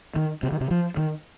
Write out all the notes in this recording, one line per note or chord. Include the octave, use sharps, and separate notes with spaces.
D#3
C3
D#3
C3
F3
D#3